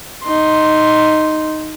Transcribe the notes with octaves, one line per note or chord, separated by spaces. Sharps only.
D#4 C6